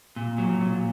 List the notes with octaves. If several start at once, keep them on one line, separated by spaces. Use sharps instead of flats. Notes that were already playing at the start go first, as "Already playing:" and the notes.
A#2
F#3
A#2